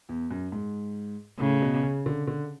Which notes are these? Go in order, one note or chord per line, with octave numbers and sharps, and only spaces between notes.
E2
F#2
G#2
A2 C#3
B2
C#3
D3
D3